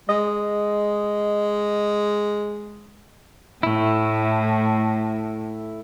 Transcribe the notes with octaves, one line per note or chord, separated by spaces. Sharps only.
G#3 D#5
A2 A3 E4